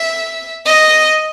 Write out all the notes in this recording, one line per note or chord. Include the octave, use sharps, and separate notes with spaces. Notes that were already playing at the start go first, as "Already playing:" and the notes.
Already playing: E5
D#5